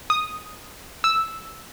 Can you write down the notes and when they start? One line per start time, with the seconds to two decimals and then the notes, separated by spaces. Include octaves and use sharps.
0.10 D#6
1.04 E6